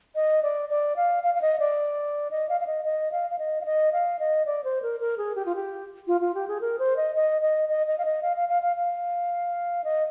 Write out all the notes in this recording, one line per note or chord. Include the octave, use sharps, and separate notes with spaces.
D#5
D5
D5
F5
F5
F5
D#5
D5
D#5
F5
F5
D#5
D#5
F5
F5
D#5
F5
D#5
F5
D#5
D5
C5
A#4
A#4
G#4
G4
F4
G4
F4
F4
G4
G#4
A#4
C5
D#5
D#5
D#5
D#5
D#5
F5
D#5
F5
F5
F5
F5
F5
D#5